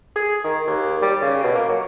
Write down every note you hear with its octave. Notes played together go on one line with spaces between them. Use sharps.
G#4
D#3
D#2
G3
C#3
B2
A#3
F#3